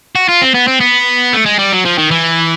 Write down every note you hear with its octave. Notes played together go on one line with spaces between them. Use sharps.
F#4
F4
C4
B3
C4
B3
A3
G#3
G3
F#3
F3
D#3
E3